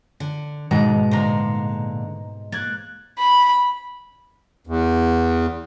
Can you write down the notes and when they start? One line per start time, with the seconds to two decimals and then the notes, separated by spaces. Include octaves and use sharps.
0.20 D3
0.71 D#2 G#2 B2 D#3 G#3 A#5
1.11 A#2 D3 C5 A#5
2.52 A#3 F#6 G#6 A6
3.19 B5
4.67 E2